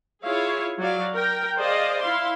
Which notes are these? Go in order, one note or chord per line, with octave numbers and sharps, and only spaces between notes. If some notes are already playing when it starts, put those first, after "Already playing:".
E4 F4 G#4 C#5 F5
F#3 D5 F5
A#4 G5
G#4 C5 D5 D#5 F5
E4 F5 C6